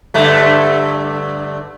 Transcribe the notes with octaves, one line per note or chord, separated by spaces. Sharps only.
G2 D3 A3